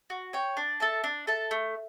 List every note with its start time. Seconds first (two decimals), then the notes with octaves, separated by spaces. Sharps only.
0.10 F#4
0.33 C#5 G5
0.57 D4
0.80 A4 E5 A5
1.04 D4
1.27 A4 E5 A5
1.51 A3